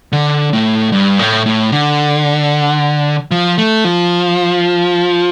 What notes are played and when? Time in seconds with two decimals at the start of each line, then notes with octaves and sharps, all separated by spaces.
0.12 D3
0.53 A2
0.92 G2
1.19 A2
1.46 A2
1.72 D3
3.31 F3
3.58 A3
3.84 F3